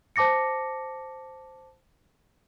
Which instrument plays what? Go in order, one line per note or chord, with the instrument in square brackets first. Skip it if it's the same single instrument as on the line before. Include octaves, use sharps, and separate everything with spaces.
[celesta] C5 A5 D6 A#6 C#7